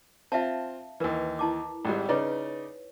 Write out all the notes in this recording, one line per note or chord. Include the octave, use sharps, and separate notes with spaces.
C4 F4 E5 F5 A5
D#2 E3 A#4 B4
E4 A5 D6
G#1 G#2 G3
C#3 D#4 B4 C#5 D5